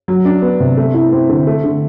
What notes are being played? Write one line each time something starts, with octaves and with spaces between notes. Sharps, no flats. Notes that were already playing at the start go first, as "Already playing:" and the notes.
F#3
D4
B3
C3
A3
E4
C4
D3
A3
D3